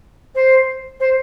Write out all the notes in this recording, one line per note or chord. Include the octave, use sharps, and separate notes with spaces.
C5
C5